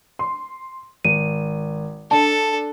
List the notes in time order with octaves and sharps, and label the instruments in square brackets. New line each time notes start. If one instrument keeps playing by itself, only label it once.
[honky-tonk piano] C6
[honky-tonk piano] G#1 [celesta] D#7
[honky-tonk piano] D4 [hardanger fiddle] A4 [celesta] A5